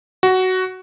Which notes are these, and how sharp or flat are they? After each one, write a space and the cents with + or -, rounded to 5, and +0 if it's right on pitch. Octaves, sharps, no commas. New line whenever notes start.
F#4 +10